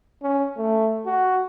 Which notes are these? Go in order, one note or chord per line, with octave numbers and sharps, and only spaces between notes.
C#4
A3
F#4